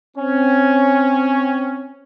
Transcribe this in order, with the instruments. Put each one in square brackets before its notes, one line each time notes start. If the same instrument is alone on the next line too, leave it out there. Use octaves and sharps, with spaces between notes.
[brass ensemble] C4 C#4